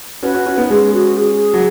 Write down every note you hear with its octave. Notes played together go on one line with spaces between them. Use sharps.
C#4 F#4 B4
C#4 F#4
C#4 F#4
B3 D#4
G#3 C#4 G#4
F#4
G#4
F#3